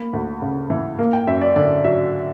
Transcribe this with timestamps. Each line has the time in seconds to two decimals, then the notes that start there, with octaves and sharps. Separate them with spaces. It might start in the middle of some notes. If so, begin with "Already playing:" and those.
Already playing: A#3 B5
0.13 D2
0.42 C#3
0.70 E3
0.99 A#3
1.13 G5
1.27 F#2 E5
1.41 D5
1.56 D3 D5
1.84 F#3 E5